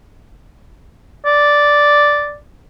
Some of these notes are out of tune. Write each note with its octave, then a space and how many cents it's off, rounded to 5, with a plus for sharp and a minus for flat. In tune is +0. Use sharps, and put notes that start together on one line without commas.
D5 -5